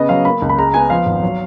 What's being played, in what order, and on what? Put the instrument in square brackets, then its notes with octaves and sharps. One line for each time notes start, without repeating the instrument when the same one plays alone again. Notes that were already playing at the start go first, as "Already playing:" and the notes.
Already playing: [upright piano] C#3 B3 D#5
F#3 F5
A#3 B5
C#2
B5
G#3 A#5
B3 G#5
F3 F5
G#1
F#3